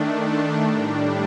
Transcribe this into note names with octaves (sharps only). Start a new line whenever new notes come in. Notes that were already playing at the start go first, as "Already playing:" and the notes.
Already playing: D#3 A3 D4
A5 C6
A2 G3 D4 G5 A#5